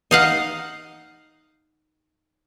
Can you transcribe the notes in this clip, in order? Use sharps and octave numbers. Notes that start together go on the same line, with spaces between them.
D#4 F5 F#5